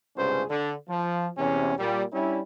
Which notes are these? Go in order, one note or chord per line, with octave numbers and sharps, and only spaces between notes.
C#2 G2 C3 C#4 G#4 C5
D3
F3
E2 C3 C#4
A#2 G3
G3 C#4 D4 E4